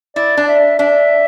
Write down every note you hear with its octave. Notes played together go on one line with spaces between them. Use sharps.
E4 D5
D4
E5
D4 E5